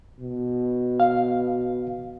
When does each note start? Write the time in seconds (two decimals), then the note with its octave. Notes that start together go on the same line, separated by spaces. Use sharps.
0.20 B2
1.00 F5